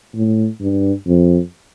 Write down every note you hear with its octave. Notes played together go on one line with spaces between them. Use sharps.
A2
G2
F2